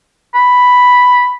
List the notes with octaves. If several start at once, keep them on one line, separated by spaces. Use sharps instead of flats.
B5